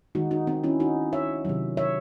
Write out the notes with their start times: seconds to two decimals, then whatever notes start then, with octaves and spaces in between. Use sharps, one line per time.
0.15 D#3 G#3 D#4 F#4
0.31 D#4 F#4
0.47 C4 D#4
0.64 C#4 E4
0.80 D#4 F#4
1.13 C#5 E5
1.45 C3 D#3 F#3
1.77 C#5 E5